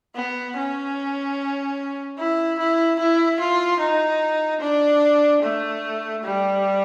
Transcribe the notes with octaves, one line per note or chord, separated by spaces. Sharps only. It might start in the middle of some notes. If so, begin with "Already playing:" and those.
B3
C#4
E4
E4
E4
F4
D#4
D4
A3
G3